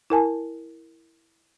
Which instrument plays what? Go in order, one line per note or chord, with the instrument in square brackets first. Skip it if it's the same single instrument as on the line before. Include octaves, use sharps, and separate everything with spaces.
[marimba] E4 A#4 G#5 A5